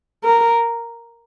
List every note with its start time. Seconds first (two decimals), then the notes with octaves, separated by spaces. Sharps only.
0.24 A#4